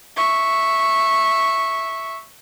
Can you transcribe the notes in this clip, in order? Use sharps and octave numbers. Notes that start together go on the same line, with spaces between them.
E5 C#6